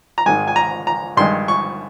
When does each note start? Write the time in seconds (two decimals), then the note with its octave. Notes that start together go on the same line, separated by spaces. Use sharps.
0.18 A#5
0.26 G#1 G#2 D#3 G#3 G#5
0.47 G#5
0.56 A#5
0.87 A#5
1.17 G2 D#3 G#3 D#4 C6
1.48 C#6